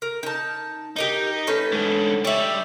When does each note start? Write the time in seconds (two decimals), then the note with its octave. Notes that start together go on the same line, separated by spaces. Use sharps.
0.02 A#4
0.23 D#4 A5
0.96 D#4 G4 A#4 D#5
1.47 A3 C#4 B4
1.72 G#2 D3
2.25 G3 C#5 E5